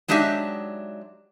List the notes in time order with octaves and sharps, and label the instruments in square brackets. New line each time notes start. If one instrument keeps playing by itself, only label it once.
[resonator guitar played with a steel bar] F#3 G#3 D4 D#4 G4 E5